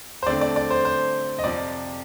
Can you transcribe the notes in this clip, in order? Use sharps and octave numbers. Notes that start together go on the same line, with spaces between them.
C5
D3 A3 C4 D5
D5
D5
C5
C5
D#5
F2 C3 F3 D5